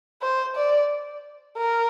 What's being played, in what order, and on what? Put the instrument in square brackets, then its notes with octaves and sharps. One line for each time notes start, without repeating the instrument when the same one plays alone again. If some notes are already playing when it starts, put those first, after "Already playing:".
[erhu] C5
D5
A#4